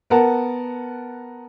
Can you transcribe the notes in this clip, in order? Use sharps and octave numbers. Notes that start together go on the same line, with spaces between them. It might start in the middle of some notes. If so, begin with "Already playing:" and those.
B3 A#4 F#5 A5